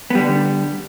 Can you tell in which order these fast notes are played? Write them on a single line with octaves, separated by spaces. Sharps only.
B3 G3 D3